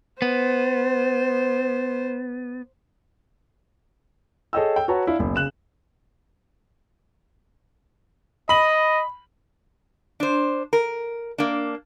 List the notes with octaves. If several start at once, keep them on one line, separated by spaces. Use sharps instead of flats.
B3 C5
G#4 A4 C#5 D#5 G5 E6
G5
F#4 B4 C#5 A5 A#5
D4 E4 F5
F#1 B1
C#3 F#6 E7
D#5 B5 F#7
D4 C5
A#4
A#3 D4